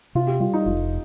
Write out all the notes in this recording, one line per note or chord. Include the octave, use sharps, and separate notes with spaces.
C3 F4
G4
G3 F4
D#4
F1 F4